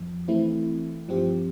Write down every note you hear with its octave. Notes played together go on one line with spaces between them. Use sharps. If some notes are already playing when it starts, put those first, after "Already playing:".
Already playing: F2 F3
E3 A3 C4 E4
G2 F3 C4 G4